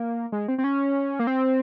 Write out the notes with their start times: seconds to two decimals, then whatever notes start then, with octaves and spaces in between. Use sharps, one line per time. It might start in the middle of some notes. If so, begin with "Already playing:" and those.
Already playing: A#3
0.32 G#3
0.48 C4
0.58 C4
0.64 C#4
1.19 A#3
1.27 C4